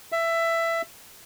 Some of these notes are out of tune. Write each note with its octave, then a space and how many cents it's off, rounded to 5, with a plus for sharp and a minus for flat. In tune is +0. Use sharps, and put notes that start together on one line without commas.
E5 +15